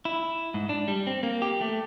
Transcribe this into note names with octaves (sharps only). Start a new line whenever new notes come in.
E4
G#2
D4
G3
C4
A#3
G4
A3